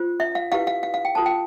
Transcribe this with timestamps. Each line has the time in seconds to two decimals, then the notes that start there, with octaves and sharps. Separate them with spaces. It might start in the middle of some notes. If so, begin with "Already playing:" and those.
Already playing: F4 C5
0.20 E5
0.35 F5
0.52 E4 G4 B4 F5
0.67 F5
0.83 F5
0.94 F5
1.05 G5
1.15 F4 A4 C5 A5
1.26 G5